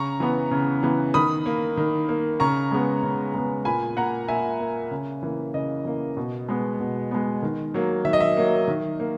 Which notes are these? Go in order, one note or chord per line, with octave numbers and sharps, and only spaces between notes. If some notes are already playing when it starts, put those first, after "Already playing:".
Already playing: C#3 A#5 C#6
E3 B3
C#3
E3 B3
D#3 B5 D#6
A#3
D#3
A#3
C#3 A#5 C#6
G#3 B3
C#3
G#3 B3
A#2 G#5 B5
A#3 F#5 A#5
A#2 E5 G#5
A#3
C#3
E3 A#3
C#3 D#5
E3 A#3
B2
G#3 B3
B2
G#3 B3
D#3
F#3 A#3
D#3 E5
D#5
E5
F#3 A#3
D#3
A#3